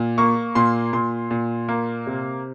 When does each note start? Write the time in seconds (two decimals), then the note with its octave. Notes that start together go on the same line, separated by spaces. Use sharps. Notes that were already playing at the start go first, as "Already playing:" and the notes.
Already playing: A#2
0.18 A#3 C#6
0.55 A#2 C6
0.93 A#2 C6
1.31 A#2
1.68 A#3
2.07 C3